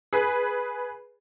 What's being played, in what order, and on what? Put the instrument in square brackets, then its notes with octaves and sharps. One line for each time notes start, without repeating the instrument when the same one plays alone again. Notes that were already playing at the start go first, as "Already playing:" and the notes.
[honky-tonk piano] G#4 B4